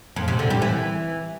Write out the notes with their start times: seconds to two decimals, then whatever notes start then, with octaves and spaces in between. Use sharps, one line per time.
0.16 F2
0.28 C3
0.39 D3
0.50 G3
0.62 E3